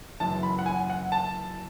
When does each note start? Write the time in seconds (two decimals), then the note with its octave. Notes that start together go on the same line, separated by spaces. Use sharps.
0.20 F#1 F#2 E3 A5
0.43 B5
0.59 F#5
0.66 G#5
0.90 F#5
1.12 A5